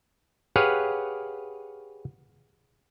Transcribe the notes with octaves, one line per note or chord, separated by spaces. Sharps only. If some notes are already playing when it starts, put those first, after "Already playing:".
G4 G#4 B4 C#5 F5 F#5